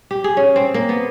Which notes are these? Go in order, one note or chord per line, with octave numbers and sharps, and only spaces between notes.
G4
G#4
C#4
C4
A#3
B3